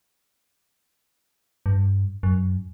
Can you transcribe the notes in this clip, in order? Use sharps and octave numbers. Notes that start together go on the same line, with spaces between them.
G2
F#2